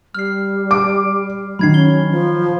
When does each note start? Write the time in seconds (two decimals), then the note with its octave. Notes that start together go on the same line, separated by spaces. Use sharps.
0.14 G3 F6 C7
0.71 D6
1.59 D#3 F#3 B5 G#6 C7
1.74 C#4 G7
2.11 F3